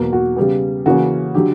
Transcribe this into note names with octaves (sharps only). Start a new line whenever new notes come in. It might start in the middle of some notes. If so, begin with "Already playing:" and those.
Already playing: E2 B2 F#3 A#3
F#4
C#3 G3 B3 G4
C#3 E3 A#3 C#4 F#4
D3 F#3 G4